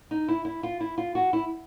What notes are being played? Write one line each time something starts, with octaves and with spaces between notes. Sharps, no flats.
D#4
E4
E4
F4
E4
F4
F#4
E4